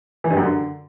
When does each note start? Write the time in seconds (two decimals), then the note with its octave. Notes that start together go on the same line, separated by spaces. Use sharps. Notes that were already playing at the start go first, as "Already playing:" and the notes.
0.24 E3
0.30 G2
0.37 F#2
0.43 D3